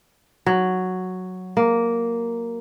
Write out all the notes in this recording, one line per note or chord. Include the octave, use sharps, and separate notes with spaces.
F#3
A#3